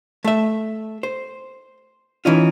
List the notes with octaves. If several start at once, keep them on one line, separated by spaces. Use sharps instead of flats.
A3 E5
C5
E3 C#4 D#4 F4